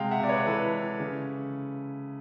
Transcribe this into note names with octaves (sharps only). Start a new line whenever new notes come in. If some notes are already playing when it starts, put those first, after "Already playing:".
Already playing: C3 G#3 F5 G5
E5 F#5
C3 D5
B4 C#5
E3 A4 B4
E3
C#3